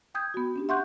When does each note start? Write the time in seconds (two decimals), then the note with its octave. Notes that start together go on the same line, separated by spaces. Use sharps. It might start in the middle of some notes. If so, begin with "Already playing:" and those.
0.15 G5 D#6 G6 G#6
0.34 B3 F#4
0.56 C#4 D4 G4
0.69 E5 F#5 C6 C#6 F#6 G6